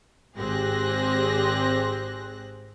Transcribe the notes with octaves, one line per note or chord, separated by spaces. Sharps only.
G#1 C4 G4 G#4 F#6 A#6